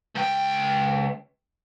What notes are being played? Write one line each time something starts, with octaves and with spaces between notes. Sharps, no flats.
C#2 G5